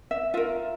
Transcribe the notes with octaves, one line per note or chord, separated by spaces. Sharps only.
E5
F4 A#4 E5